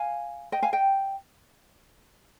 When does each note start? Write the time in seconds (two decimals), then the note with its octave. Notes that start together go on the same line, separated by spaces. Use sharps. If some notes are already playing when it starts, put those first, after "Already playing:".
Already playing: F5 G#5
0.52 D#5 G5
0.62 F5 G#5
0.73 D#5 G5